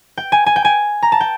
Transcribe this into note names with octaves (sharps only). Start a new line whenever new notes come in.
G5
G#5
G#5
G5
G#5
A#5
A5
G5